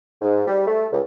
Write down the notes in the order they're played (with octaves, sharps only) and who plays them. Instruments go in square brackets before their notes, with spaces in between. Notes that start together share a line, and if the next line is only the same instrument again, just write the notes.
[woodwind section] G#2
G3
A3
C#2